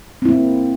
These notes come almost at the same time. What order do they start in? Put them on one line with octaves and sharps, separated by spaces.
C4 E4 A#3